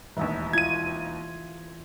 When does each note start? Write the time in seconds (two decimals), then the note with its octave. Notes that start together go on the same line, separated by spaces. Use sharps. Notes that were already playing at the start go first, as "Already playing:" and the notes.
0.17 E1 A1 D#2 E3 E5
0.53 E4 F4 G#6 D#7